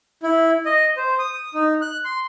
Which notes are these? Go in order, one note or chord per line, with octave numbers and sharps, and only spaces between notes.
E4
D#5
C5
D#6
D#4
F#6
C6